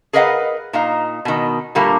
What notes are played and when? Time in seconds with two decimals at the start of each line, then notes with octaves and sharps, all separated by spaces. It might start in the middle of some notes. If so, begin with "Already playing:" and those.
0.13 G#4 A#4 B4 D#5 F5 F#5
0.73 A#2 D#4 F5
1.25 B2 D#3
1.75 A#2 D3 G3 A3 A#3